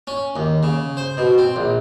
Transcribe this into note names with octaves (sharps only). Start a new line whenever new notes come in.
C#4
D#2
C#3
C5
B2
C4
A#1